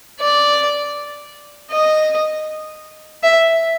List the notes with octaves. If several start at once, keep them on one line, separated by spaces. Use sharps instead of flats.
D5
D#5
E5